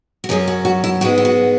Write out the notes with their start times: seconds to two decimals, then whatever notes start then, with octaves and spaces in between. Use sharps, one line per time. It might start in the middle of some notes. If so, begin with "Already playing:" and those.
0.24 F#4
0.29 F#2 F#3 C#4 G#4
0.48 F#4
0.65 F#4
0.84 E4
1.01 G#2 G#3 B3 F#4
1.18 E4
1.25 F#4